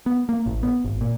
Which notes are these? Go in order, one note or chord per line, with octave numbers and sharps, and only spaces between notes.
B3
A#3
A1
B3
G#1
A#2